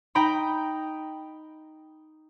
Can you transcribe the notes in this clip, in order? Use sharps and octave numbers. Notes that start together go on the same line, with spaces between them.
D#4 G5 A#5 B5